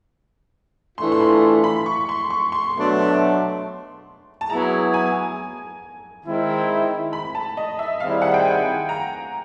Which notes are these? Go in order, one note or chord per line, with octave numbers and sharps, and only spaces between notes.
A2 E3 A3 D4 F4 C6
C6
B5
B5
C#6
C6
C#6
C6
B2 F#3 A3 D4
A5
F#3 B3 E4 G#4 A#5
G#5
D#3 G#3 C4 E4
B5
A5
D#5
E5
D#3 G3 C4 E4 G#4 F5
F#5
G5
G#5
A#5